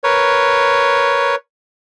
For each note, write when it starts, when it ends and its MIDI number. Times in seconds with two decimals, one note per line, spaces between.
0.04 1.35 70
0.04 1.35 71
0.04 1.35 73